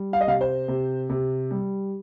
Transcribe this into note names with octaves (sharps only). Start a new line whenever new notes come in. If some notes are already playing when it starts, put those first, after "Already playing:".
Already playing: G3
F5
D#5
C3 F5
C5
C3
C3
G3